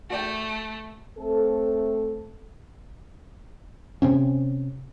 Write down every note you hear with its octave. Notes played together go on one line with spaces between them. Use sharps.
A3 F#4 D5 G5
A3 C4 A4
C3 C4 C#4